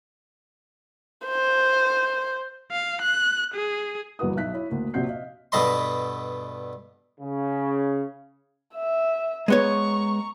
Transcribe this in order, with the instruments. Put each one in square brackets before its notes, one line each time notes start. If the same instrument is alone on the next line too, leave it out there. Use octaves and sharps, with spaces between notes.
[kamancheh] C5
[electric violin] F5
F#6
G#4
[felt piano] G1 E2 A#3 F#4 B4 D#6
B1 E5 F#6 B6
E4 C#5
D2 A#3
A#1 C3 C4 F#4 G6 C7
D#5 F5
[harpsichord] G2 B2 A4 D#5 B5 C6
[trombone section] C#3
[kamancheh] E5
[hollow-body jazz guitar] G#3 B3 C#5 [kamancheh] A#5 C#6